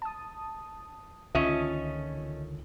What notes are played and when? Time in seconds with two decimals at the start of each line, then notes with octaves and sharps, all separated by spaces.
0.02 A5 D#6
1.35 C#2 D3 D#3 A3 C#4 F4 D#5 E5